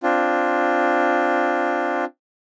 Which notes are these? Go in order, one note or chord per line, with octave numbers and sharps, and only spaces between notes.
C4 D4 F4